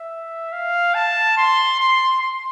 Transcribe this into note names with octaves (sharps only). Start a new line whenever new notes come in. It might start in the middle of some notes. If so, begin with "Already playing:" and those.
Already playing: E5
F5
A5
C6
C6
C6